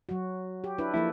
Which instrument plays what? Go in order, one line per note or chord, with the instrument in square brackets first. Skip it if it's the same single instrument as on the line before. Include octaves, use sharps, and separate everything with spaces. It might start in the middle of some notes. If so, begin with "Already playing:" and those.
[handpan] F#3 F#4
G4
D4 E4 B4
[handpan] F3 A#3 A4 [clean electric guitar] E4